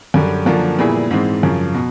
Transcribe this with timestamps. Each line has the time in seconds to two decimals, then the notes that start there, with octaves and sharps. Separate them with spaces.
0.14 F#2 D3 G3
0.46 F#2 D3 F3 A#3
0.79 A#2 G3 B3 E4 G#4
1.11 G#2 E3 G#3 C4
1.43 F#2 C#3 F3
1.74 B2